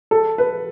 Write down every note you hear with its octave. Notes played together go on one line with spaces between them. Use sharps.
A4
B4